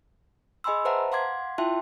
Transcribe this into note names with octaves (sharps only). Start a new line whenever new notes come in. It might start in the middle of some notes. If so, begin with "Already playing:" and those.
G#4 D#5 G#5 B5 C6 E6
B4 C5 E5 F#5 A5 A#5
F5 F#5 C6 D6 G#6
E4 F4 E5 G5 A5 C6